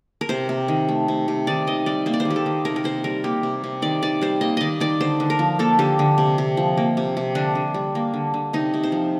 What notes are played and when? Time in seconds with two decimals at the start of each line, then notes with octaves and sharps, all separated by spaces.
0.21 A#4
0.29 C3 C5
0.49 C3
0.68 D#3
0.88 A3
1.08 C3
1.28 C3
1.47 D#3 D5
1.67 D#3 D#5
1.86 G3 D5
2.06 A#3 C5
2.14 D5
2.20 C5
2.25 D#3
2.30 G4
2.36 A4
2.46 D#3
2.65 C3 A#4
2.76 A#4
2.84 C3 C5
3.04 G3 A#4
3.24 A#3 G4
3.43 C3
3.64 C3
3.82 D#3 D5
4.02 D#3 D5
4.21 G3 C5
4.41 A#3 D#5
4.57 D#3 D5 D#5
4.80 D#3 D5
5.01 D3 C5
5.20 D3
5.30 A#4
5.39 F3
5.59 A#3 A4
5.79 D3 G4
5.99 D3
6.18 C3
6.38 C3
6.57 F3
6.77 A#3
6.97 C3
7.17 C3
7.35 D3 D4
7.55 D3
7.74 G3
7.95 A#3
8.14 D3
8.34 D3
8.53 C3 D#4
8.74 C3
8.83 C5
8.92 F3